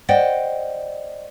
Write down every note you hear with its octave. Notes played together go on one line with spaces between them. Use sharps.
C5 D5 D#5 F#5 G5